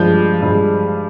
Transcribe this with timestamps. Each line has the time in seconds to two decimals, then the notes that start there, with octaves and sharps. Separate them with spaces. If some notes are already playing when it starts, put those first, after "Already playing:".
Already playing: G2 F3 G#3 G6
0.42 G2 F3 G#3